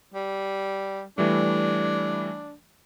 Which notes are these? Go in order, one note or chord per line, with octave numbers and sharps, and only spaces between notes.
G3
E3 G3 A3 D4